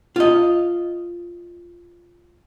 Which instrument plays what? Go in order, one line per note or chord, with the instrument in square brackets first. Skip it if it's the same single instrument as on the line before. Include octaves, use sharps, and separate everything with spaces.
[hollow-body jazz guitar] F4 D#5